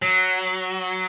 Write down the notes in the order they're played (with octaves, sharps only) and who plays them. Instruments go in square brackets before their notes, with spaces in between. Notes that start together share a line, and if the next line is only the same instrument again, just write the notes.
[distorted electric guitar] F#3